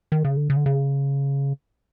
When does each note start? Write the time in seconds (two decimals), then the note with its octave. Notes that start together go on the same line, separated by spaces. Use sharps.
0.12 D#3
0.24 C#3
0.37 D3
0.50 C#3
0.57 D3
0.66 C#3